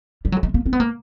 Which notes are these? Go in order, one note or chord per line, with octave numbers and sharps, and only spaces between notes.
G3
F#3
G#3
A#3
C4
B3
A#3